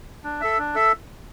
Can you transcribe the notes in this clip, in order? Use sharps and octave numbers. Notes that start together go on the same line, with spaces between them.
D4
A4 E5
D4
A4 E5